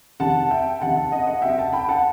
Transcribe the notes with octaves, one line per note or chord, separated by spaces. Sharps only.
C3 D#3 G3 F#5 A5
E5 G5
C3 D#3 G3 F#5 A5
F#5 A5
D#5 F#5
D#5 F#5
C3 F#3 E5 G5
F#5 A5
G5 B5
F#5 A5